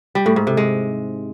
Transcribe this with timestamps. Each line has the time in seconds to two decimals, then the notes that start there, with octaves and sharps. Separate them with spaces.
0.15 G3
0.26 A2
0.36 G#2
0.47 C3
0.57 G#3